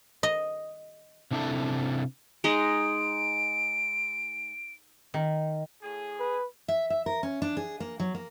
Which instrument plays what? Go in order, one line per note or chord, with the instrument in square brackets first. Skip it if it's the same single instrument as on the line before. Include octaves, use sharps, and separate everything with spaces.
[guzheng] D#5
[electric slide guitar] C3 D4 E4 A4
[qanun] G#3 D#4 [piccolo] D7
[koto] D#3
[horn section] A2 G#4
[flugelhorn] B4
[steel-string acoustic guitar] E5
E5
A#4
C#4
D4
G#4
A#3
F#3
A#3